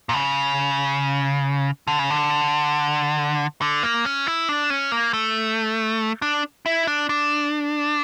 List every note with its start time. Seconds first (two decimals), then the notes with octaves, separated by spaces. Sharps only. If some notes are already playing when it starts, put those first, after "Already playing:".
0.09 A#2
0.13 C#3
1.87 D3
1.99 C#3
2.10 D3
3.61 D3
3.83 A#3
4.05 C#4
4.27 E4
4.49 D4
4.70 C#4
4.92 A#3
5.13 A3
6.22 D4
6.66 E4
6.87 D4
7.09 D4